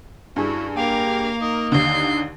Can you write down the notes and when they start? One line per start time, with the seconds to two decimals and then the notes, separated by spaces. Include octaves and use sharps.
0.36 G2 C#4 E4 F#4 G#4
0.77 A#3 G4 A#4 F5
1.41 D#4 A#4
1.72 D#2 D3 G6 C7